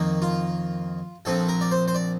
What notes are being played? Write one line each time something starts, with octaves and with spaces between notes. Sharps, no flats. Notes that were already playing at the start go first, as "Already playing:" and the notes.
Already playing: F2 D#3 A#3
F4
A#1 A#2 F3 C4 A4
A#4
D5
C5
C5
D5